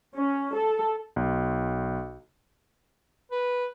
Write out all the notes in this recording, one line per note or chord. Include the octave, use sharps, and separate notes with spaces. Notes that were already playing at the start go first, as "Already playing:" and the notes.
C#4
A4
B1
B4